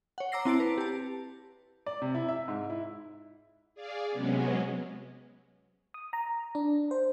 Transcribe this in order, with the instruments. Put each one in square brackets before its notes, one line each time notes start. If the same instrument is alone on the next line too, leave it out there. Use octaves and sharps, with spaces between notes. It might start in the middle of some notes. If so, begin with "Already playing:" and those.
[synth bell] C#5 F#5
A#5 D6 E6 A#6 C7
C4 E4 A5 D7
B4
G4 A5
[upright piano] D5
C3
E4
E5
G#2
E4
[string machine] G#4 D5 F5
C3 F#3 G#3 B3 C#4
[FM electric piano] D#6
A#5
D4
C5